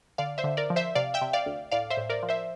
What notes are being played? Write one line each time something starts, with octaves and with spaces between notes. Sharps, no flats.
D3 D5 F5
C5 E5
D3
A#4 D5
F3
C5 E5
C3 D5 F5
E5 G5
C3
D5 F5
D2
A2 D5 F5
C5 E5
A2
A#4 D5
F3
C5 E5